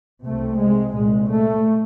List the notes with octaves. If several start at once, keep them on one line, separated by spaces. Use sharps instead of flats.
C2 C3 A3
G#3
C2 A#2 G#3
A3